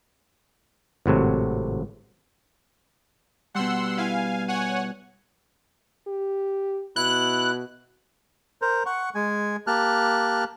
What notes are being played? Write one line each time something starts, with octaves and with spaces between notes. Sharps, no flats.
G#1 A2 C3 F#3
B2 G3 F#5 C6 E6
E4 F5 G#5
C#5 F#5 G#5
G4
B2 E4 F#6
A#4 C5
F#5 C#6
G#3 G#5
A#3 G4 A5 F6 F#6